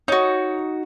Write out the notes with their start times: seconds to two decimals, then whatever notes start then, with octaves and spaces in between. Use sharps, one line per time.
0.08 D#4 F#4 C#5